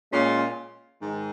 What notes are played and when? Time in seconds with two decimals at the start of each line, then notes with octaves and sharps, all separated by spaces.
0.12 A#2 G#3 C#4 F4
1.02 G#2 D#3